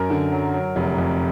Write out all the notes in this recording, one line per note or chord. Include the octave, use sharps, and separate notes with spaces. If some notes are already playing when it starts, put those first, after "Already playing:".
Already playing: F#2 A#4
D3
F#3
F#3
F1
F2